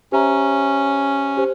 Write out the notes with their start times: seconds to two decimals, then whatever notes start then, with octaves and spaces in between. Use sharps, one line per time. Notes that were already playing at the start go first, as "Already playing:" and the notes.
0.12 C#4 G4 C5 E5 A#5
1.37 G4 C5